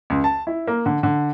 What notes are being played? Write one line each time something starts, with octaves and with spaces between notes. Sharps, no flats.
C#2
A5
E4
A#3
D3
D3